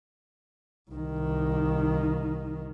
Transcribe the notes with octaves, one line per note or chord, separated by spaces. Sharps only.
C2 D#3